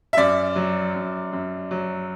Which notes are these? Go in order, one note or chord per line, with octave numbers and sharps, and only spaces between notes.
E5
F#2 D5
F#3
F#2
F#2
F#3